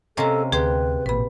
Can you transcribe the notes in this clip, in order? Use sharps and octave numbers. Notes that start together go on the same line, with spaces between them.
C3 A#3 C#4 A4 D#5 A#5
D2 G4 G#4 B4 C5
A1 A#2 B4 B5